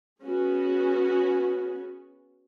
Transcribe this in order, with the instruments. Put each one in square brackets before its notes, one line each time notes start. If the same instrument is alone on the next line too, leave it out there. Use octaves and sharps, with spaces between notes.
[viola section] B3 C#4 F#4 G#4